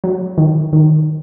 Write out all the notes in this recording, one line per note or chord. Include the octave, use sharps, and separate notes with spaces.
F#3
D#3
D#3